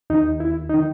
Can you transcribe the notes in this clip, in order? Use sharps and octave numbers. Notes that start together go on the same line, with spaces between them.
D#2 D#3 D#4
E4
D#4
D#3